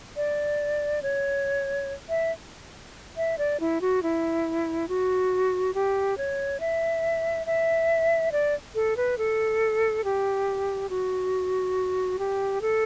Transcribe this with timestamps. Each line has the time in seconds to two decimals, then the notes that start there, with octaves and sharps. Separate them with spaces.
0.16 D5
1.03 C#5
2.09 E5
3.17 E5
3.38 D5
3.60 E4
3.81 F#4
4.03 E4
4.89 F#4
5.74 G4
6.18 C#5
6.60 E5
7.46 E5
8.32 D5
8.75 A4
8.97 B4
9.18 A4
10.04 G4
10.90 F#4
12.19 G4
12.62 A4